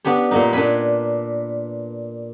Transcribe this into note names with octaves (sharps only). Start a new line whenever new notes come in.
B3 D4 G4 C#5
A#2 A#3 D#4
A#2 D4 B4 G#5 B5